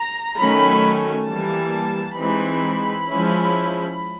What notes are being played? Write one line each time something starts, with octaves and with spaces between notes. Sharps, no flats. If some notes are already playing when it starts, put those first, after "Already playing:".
Already playing: A#5
D#3 F#3 A3 C#4 B5
E3 G3 A#3 A5
E3 G#3 C4 D#4 B5
F3 G#3 C#4 E4